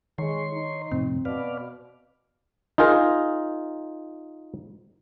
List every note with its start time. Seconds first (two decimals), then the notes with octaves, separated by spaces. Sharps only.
0.18 D#3 G#3 C#5 C6
0.53 D#4
0.92 F2 A2 C3 C4
1.25 B2 B4 D5 F5
2.78 D#4 F4 G#4 A#4